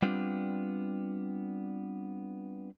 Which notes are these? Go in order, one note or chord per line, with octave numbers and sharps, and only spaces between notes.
G3 B3 C4 D4 F4